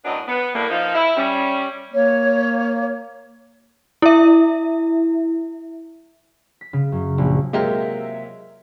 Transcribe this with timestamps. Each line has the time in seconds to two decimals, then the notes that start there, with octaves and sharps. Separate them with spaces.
0.05 F#2 A2 F#3 B3 D4 D#5
0.27 B3
0.55 A2 G3 A#3
0.70 F3 D#4
0.95 E4
1.17 G3 C#4
1.93 A#3 C#5
4.02 E4 E5
6.61 B6
6.73 C#3
6.92 F#2
7.18 A#1
7.53 C3 F#3 G#3 A#3 F4 G4 A#4 E5